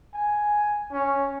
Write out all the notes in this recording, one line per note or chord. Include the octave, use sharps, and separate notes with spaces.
G#5
C#4